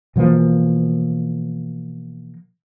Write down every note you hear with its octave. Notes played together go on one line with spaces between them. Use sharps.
B2 E3 F3 A#3